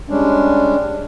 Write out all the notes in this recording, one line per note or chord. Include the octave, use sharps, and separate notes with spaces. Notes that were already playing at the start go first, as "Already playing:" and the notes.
G3 G#3 C#4 D4